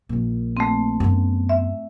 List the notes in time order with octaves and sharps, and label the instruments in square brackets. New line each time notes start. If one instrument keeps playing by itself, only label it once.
[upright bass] A#1 A#2
[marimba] A3 C4
[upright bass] F#2 B3
[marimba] E5